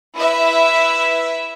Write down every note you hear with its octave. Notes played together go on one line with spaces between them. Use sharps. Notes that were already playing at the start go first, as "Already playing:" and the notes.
E4 B4 E5